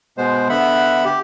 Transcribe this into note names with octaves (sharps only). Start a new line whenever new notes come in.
B2 G#3 B3 C5
D3 B3 E5 F#5 B5
G4